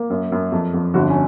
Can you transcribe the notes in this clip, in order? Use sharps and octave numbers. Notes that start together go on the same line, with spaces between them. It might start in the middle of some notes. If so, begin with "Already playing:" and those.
Already playing: A#3
F#2
F#2
F2
F2
G1 F#4
C#4